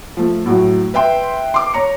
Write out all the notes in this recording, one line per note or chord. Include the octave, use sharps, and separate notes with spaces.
F3 A3
A2 F#3 F#4
B4 E5 G5 C6
C6 D6
C#5 A#5 C#7